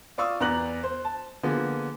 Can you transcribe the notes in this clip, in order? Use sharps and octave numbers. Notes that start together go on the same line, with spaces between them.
F4 D5 F5 C#6 D#6 E6
E2 B3 D5 A#5 F#6 F#7
C5
A5
D3 F3 A#3 B3 G#4